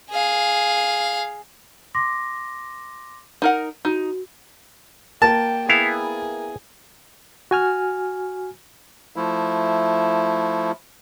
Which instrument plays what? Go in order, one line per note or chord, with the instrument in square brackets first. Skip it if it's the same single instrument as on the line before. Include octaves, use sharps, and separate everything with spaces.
[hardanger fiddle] G#4 F5
[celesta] C6 D6 A#6
[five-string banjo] D#4 A#4 F#5
[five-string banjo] D#4 [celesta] F#4
[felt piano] A#3 [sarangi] G5 [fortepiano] A5
[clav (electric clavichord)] B3 E4 F5 [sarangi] G#4
[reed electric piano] F#4 G#5 F6
[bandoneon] F3 A3 E4